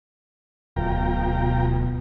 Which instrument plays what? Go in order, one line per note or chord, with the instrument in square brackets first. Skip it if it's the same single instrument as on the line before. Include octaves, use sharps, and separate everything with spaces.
[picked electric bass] D1 [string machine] B2 [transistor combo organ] F4 G5 A#5